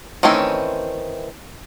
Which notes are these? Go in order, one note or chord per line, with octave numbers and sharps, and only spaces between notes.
D#3 E3 A3 C4 C#4